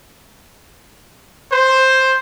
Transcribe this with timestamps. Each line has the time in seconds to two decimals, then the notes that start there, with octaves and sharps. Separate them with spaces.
1.51 C5